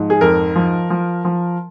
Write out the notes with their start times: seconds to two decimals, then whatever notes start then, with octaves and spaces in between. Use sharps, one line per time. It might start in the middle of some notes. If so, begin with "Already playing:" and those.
Already playing: G#2 F3
0.10 G#4
0.21 F2 A#4
0.56 F3
0.90 F3
1.25 F3